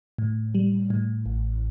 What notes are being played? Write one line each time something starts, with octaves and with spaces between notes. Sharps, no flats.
A2
G3
A2
A1